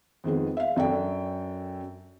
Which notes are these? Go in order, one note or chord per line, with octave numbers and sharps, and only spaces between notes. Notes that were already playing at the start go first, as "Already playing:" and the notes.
F2 D#3 G#3 B3
E5 F5
F#2 D4 A4 G5